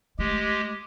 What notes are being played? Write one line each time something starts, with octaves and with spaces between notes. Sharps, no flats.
G#3 A3 G4